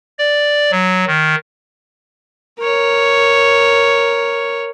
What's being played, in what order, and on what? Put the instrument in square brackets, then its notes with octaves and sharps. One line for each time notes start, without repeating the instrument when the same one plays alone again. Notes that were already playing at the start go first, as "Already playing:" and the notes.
[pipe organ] D5
F#3
D#3
[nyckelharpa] A#4 C#5